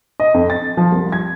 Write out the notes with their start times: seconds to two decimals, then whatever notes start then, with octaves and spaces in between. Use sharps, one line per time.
0.20 D#5
0.34 F2
0.50 A6
0.77 F3
0.92 C2
1.12 G#6